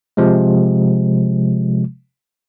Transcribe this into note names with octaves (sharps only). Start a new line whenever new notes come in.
C3 F3 G#3